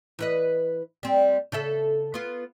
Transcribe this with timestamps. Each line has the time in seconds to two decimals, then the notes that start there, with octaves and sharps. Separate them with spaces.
0.19 E3 B4 D#5
1.03 G3 C4
1.52 C#3 A4 E5
2.14 B3 F4